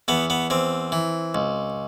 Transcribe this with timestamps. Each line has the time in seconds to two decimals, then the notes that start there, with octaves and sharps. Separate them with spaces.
0.08 E2 B3
0.30 B3
0.50 E2 C4
0.92 E3
1.35 C#2